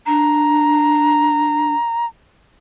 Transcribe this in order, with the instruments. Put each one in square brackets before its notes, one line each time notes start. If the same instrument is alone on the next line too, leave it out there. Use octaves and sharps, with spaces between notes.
[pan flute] D4 [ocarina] A#5